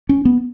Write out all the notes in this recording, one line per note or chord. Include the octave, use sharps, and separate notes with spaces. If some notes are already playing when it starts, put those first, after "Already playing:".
C#4
B3